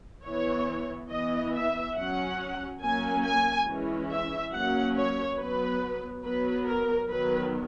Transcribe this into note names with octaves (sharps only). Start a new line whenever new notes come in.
E3 B3 C#5
E3 B3 D#5
E5
F#3 C#4 F#5
F#3 A#3 C#4 G#5
G#5
E3 G#3 C#4
E5
F#3 A#3 C#4 F#5
C#5
F#3 B3 B4
F#3 B3 B4
A#4
D#3 F#3 B3 B4